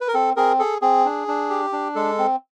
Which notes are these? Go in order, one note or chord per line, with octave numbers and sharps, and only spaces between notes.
B4
A#4
C4 A4
C4 G#4 A#4
G#4 A4
C4 G#4
D4
D4
G4
D4
G#3 A4
C4